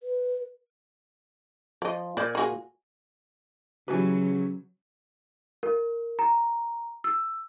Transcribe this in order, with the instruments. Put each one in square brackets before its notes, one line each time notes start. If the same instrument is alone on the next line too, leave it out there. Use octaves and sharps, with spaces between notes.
[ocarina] B4
[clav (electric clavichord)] F3 [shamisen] D5 D#5
[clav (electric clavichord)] A#2 [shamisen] C5 D5
[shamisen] F4 F#4 G#4
[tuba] C#3 [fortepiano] E3 G3 B4 [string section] F#3 [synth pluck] F#4
[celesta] A#4
A#5
E6